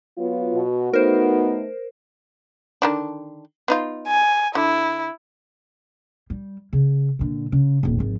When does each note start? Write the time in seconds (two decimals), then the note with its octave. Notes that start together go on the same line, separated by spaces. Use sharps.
0.18 F#3 B3 F4
0.54 B2 F#4
0.94 A3 B3 D#4 A#4 C5
2.82 D3 D#3 D4
3.68 B3 D#4 F4
4.08 G#5
4.55 D3 E4
6.30 G3
6.73 C#3
7.19 A#2 D3
7.52 C#3
7.83 D#1 D#2
7.99 G#1 F3